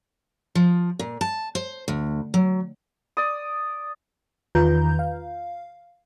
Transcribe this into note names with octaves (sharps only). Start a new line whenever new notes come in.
F3
A#2
A5
C5
D2
F#3
D5 D#6
E2 D#3 F4 B4 A#5 G6
F5